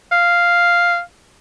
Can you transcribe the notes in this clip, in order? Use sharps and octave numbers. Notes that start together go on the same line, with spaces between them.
F5